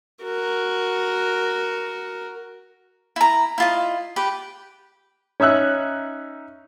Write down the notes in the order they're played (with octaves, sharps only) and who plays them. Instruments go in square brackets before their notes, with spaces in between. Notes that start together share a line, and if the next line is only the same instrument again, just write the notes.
[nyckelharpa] F#4 A#4
[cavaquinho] E4 A#5
E4 F4 D#5
G4 B4 G5
[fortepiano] C#4 D#4 E5 E6 F#6